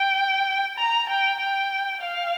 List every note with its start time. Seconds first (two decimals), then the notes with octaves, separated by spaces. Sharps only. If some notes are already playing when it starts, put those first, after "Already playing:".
Already playing: G5
0.77 A#5
1.09 G5
1.39 G5
2.01 F5